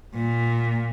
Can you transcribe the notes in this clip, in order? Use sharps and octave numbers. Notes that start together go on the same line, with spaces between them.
A#2